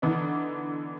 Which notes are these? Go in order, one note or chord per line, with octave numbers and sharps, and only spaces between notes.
D3 E3 B3 D4 D#4